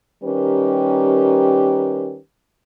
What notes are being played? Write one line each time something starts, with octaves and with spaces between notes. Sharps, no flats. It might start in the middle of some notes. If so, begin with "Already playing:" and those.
D#3 G3 C#4 G4 A#4 B4